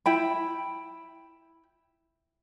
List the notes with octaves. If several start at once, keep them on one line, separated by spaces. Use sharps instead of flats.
E4 G5 B5